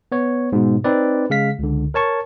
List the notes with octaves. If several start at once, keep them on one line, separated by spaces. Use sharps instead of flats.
B3 C#5
G#2 B2
C4 D#4 B4 D5
C#3 G#3 F5 B6
C#2 D3
A#4 C#5 A5 C#6